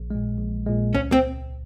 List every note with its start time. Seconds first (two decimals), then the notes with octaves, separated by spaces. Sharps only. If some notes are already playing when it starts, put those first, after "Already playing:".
Already playing: A#1
0.10 A#2 G#3
0.38 A#1
0.66 A#2 G#3
0.94 C#2 C#4
1.12 C4